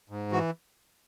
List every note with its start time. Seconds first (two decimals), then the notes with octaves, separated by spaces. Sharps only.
0.09 G#2
0.32 E3 F#4